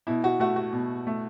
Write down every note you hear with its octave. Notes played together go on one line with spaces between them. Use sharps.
B2 E4
F#4
A3 F#4
F#4
B2
A3